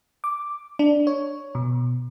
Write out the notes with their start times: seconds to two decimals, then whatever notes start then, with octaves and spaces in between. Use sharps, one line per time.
0.24 D6
0.79 D4
1.07 C#5
1.55 B2